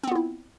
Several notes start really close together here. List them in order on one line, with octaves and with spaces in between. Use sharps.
C4 B3 F4 E4